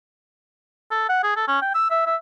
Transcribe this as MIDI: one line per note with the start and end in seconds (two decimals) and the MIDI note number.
0.91 1.05 69
1.09 1.22 78
1.23 1.32 68
1.36 1.45 69
1.48 1.59 61
1.62 1.73 79
1.75 1.88 88
1.91 2.02 76
2.06 2.15 76